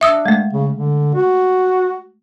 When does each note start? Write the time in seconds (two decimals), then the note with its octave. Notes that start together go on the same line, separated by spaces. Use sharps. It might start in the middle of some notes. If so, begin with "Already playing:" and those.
0.01 D4 E5 D#6 E6
0.26 G#3 A3
0.53 C#3
0.73 D3
1.15 F#4